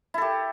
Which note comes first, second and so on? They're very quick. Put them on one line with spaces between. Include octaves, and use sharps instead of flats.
E4 A4 G4